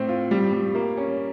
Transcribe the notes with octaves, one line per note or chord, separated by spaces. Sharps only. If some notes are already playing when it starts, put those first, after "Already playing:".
Already playing: A2 C4
F4
G3
G3
A#3
C#4